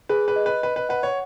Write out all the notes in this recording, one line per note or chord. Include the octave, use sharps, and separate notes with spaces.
G#4 B4
B4
D#5
B4
B4 D#5
B4
B4 F#5
C#5